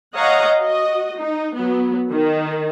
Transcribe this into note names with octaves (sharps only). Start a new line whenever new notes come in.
C#5 D#5 F5 F#5 A#5
F#4 D#5
D#4
F#3 B3
D#3